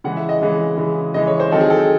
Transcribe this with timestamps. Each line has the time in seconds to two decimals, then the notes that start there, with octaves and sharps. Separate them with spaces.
0.04 C#3 E3 G#3 F#5
0.17 E5
0.29 D#5
0.41 C#3 E3 G#3
0.77 C#3 E3 G#3
1.14 C#3 E3 G#3 D#5
1.27 C#5
1.40 C5
1.51 D#3 F#3 C4 D#4 A4
1.60 G#4
1.70 A4